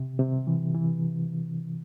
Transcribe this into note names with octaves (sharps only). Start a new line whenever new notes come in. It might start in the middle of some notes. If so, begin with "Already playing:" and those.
Already playing: C3
C3
E3
E3